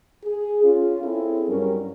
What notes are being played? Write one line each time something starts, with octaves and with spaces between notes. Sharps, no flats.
G#4
C#4 F4
C4 C#4 E4 G#4 A4
G2 F#3 C#4 A#4